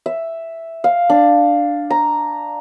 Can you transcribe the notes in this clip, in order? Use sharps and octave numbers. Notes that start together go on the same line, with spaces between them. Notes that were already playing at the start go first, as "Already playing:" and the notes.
E5
F5
D4
A#5